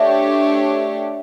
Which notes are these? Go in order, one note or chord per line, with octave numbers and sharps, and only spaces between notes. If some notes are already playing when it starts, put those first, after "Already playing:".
Already playing: A3 D4 G4 C#5 E5